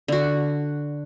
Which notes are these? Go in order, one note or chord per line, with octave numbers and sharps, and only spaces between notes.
D3 F#4